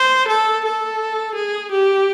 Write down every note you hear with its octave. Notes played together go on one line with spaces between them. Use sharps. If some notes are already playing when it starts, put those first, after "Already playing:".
Already playing: C5
A4
A4
G#4
G4